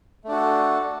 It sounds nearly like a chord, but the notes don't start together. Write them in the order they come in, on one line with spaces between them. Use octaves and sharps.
A3 D4 F#4 A4